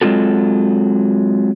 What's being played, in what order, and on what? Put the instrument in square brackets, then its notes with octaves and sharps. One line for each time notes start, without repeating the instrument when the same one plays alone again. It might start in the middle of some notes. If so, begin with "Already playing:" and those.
[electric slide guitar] F#3 G#3 C4 F4 F#4 A4